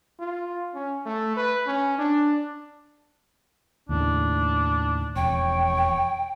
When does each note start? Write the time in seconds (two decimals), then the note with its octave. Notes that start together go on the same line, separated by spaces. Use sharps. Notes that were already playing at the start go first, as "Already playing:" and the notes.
0.19 F4
0.75 C#4
1.06 A3
1.37 B4
1.67 C#4
1.99 D4
3.89 D#2 A2 C#3 D4
5.16 E1 F2 C#5 G5